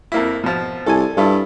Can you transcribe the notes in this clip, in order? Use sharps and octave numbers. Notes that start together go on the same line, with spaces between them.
F2 A#3 E4
B2 F3
C2 A4 G#5
G2 E4 F4 A4